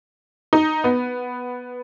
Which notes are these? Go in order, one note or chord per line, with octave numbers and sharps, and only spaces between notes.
D#4
B3